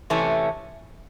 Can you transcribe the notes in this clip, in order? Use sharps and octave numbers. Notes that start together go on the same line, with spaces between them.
C3 E3 A3 C#4